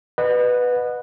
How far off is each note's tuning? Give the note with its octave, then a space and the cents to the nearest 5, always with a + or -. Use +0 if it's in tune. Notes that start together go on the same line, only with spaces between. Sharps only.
B4 +0 D#5 -35 F#5 -25